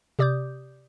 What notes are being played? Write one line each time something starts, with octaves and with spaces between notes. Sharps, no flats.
C3 G4 D5 D6 D#6 G6